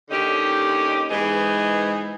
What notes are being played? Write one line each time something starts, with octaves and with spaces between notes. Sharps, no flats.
D#2 D3 C#4 D#4 G4
G#2 E3 B3 D#4 G#4 D#5